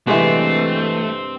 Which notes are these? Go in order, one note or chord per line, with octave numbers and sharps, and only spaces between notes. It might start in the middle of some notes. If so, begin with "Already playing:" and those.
G2 C3 E3 G#3 A3 C4 E5 F#5